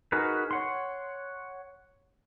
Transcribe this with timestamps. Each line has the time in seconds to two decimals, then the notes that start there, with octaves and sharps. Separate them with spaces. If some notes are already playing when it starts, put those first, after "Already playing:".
0.12 D#4 F#4 G#4 A#4 B4
0.51 C#5 F#5 C6